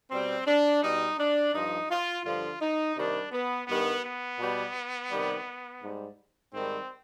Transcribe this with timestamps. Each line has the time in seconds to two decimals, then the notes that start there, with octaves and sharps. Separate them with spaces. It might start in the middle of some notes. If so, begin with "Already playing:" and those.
0.11 B2 G3 C4
0.47 D4
0.82 B2 G3 D#4
1.19 D4
1.54 G2 F3 D#4
1.90 F4
2.25 G2 D3 F3 F4
2.61 D#4
2.97 C3 D#3 G3 D4
3.32 B3
3.68 G2 D#3 G3 B3
4.04 B3
4.39 B2 G3
5.10 C3 D#3 G3
5.83 G#2 G3
6.53 G#2 D#3 G3 C4